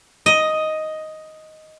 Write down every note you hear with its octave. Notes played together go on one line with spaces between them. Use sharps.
D#5